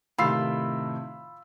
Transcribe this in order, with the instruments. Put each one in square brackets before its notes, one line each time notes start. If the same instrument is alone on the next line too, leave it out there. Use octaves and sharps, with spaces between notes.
[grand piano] A2 C3 D#3 [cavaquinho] F4 [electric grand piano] B5 E6 C7